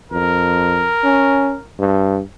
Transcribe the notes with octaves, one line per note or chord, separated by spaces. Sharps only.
F2 A#4
C#4
G2